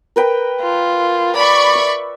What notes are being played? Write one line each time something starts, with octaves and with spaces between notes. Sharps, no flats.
A#4 B4 G5
F4
D5 B5 C#6
E5